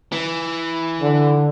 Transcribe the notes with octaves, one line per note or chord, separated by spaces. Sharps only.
E3
D3